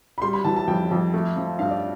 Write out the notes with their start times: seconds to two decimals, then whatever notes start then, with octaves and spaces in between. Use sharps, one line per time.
0.18 B5
0.22 G3 C6
0.33 B5
0.45 E3 A5
0.56 A5
0.68 F2 G5
0.91 F2
1.13 A3
1.36 F3
1.59 G2 F5
1.70 D5